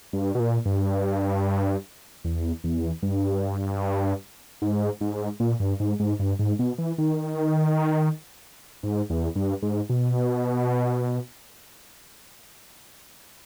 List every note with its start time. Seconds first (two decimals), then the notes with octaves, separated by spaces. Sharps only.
0.13 G2
0.35 B2
0.40 A#2
0.66 G2
2.24 E2
2.64 E2
3.02 G2
4.62 G#2
5.01 G#2
5.40 A#2
5.60 G2
5.80 G#2
6.00 G#2
6.20 G2
6.39 G#2
6.59 B2
6.78 E3
6.98 D#3
8.83 G#2
9.10 E2
9.36 G2
9.63 G#2
9.90 B2